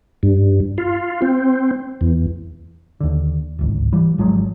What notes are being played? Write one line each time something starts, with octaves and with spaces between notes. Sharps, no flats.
G2
F4
C4
E2
D#2 D3
D1 G#1 C#2
E3 G3
G#1 F3 F#3 G#3